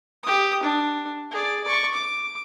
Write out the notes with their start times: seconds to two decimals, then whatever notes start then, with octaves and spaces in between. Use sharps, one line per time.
0.23 G4 D#6
0.63 D4
1.32 G#4 D5
1.64 D5 C#6
1.94 D6